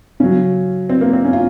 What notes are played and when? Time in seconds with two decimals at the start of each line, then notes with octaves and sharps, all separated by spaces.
0.20 C#3 F#3 C#4
0.89 C4
1.01 A#3
1.13 C4
1.25 C#4
1.33 F4